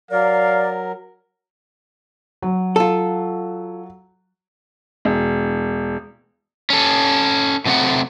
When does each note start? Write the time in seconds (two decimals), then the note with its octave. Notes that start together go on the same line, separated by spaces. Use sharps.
0.11 F#3 A#4 D5 F5
2.42 F#3
2.76 F4 A4
5.05 E1
6.70 C#4 A4
7.66 A2 C3 F#3 A3 C4 F#5